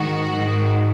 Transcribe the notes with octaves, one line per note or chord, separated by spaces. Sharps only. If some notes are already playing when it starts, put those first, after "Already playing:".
Already playing: G#2 D#3 F#4
G#2 D#3